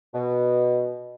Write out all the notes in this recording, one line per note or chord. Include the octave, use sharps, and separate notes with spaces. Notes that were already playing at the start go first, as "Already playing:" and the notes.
B2